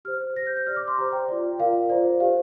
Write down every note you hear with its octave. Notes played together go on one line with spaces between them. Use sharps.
G4 C5 F6
G4 C5 A#6
G6
G6
G4 D5 F6
D6
C6
G4 C5 A#5
G5
F4 D5
F4 A#4 D5 F5
F4 C5 D5
G4 C5 F5